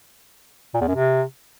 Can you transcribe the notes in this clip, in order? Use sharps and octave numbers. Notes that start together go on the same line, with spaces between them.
A#2
E2
F#2
C3